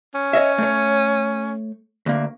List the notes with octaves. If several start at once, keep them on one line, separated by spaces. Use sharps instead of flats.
C#4
C#5 D#5 E5
A3 C#5
D2 A#3